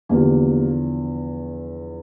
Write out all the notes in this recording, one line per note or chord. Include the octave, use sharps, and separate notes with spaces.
E2 D3 F3 G3 A#3